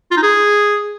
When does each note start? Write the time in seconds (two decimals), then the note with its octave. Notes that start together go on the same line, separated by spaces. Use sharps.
0.11 F4
0.17 D#4
0.23 G#4